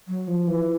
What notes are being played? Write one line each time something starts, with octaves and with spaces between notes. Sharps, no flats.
F#3
F3
E3